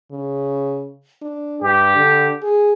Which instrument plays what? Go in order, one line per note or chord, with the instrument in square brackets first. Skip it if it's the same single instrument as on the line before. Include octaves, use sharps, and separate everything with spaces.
[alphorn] C#3
D4
[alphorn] G2 [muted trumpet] G4
[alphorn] D3
G#4